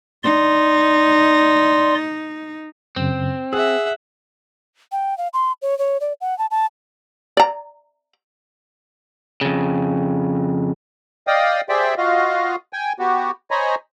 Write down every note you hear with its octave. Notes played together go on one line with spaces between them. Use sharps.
D#4 D5 C6
F#2 C#3 C4
G#4 E5 F#5 E6
G5
F5
C6
C#5
C#5
D5
F#5
A5
A5
D5 A#5
F2 C#3
D5 D#5 F5 G5 D#6
G4 G#4 C5 D5 E5 G5
F4 F#4 D#5 F5
G5 G#5
B3 F#4 G4
C5 C#5 D#5 G#5 A#5 B5